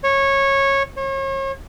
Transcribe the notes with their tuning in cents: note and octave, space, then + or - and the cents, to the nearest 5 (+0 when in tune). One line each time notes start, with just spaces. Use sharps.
C#5 -15
C#5 -40